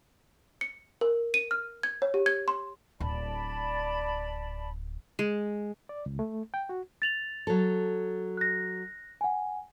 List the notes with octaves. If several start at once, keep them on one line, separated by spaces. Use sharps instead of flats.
C#7
A#4
D#7
F6
G#6
C#5
G4
G#6
C6
D1 D5 A5 B5
G#3
D5
C#2
A3
G5
F#4
A6 F7 F#7
F#3 A4
F#6 A#6
F#5 G#5